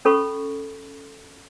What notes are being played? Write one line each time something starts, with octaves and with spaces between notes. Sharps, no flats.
C#4 A4 B5 C#6